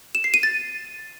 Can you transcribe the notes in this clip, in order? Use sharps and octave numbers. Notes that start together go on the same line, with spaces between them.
E7
C7
D#7
A6